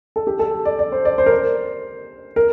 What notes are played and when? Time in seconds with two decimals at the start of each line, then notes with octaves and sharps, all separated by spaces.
0.16 A4
0.27 G4
0.39 A4
0.65 D5
0.79 D5
0.92 C5
1.05 D5
1.18 C5
1.26 A#4
1.31 C5
2.36 A#4